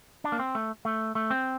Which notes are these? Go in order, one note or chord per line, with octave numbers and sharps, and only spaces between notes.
D4
A#3
C4
A3
A3
A3
C4